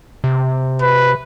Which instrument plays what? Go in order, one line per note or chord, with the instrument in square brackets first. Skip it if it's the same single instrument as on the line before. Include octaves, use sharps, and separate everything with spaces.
[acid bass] C3
[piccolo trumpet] B4